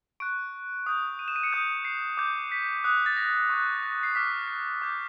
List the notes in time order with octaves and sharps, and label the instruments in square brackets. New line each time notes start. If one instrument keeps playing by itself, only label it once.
[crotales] C#6 F#6 D7
D#6 G6
D#7
E7
D#7
C#7
D#6 G6
C7
D6 G6
B6
D#6 F#6
A6
A#6
C#6 F#6
A#6
C7
D6 F6 B6
C7
D6 G6